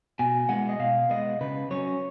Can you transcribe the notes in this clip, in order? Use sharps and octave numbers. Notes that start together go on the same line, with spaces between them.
B2 G#5
G#3 B3 F#5
D#5
B2 F5
G#3 B3 D#5
C#3 B4
F#3 C#4 C#5